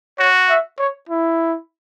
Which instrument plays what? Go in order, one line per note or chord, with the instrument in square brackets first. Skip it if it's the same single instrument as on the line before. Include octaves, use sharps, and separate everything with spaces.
[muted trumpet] F#4 [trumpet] C#5
[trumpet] E5
C#5
E4